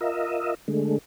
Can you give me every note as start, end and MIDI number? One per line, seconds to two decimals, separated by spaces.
0.01 0.55 65
0.01 0.55 70
0.01 0.55 75
0.01 0.55 76
0.68 0.98 50
0.68 0.98 56
0.68 0.98 57